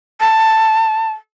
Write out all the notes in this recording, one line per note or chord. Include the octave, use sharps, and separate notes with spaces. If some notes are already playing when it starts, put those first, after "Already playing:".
A5